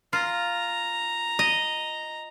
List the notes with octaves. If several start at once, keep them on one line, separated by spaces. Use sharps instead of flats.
F4 A#5
D#5